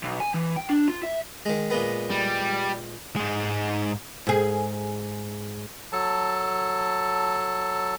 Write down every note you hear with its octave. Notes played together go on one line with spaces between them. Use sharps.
B1
G#5
E3
G5
D4
F4
E5
D#3 G#3
A#2 G#3 B3
G3
G#2 G#3
G#2 G#4
F#3 A4 A5